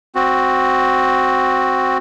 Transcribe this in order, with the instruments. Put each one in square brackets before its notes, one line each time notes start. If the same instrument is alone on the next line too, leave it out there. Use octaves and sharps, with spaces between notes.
[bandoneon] C4 F#4